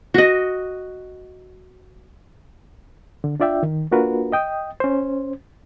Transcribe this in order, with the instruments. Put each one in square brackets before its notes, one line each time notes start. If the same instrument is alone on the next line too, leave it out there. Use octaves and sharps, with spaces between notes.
[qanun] F#4 D#5
[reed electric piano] D3
D4 F4 D5 E5 G5
D#3
A#3 D4 F4 F#4 A#4 B4
D#5 G5 D#6
C#4 C5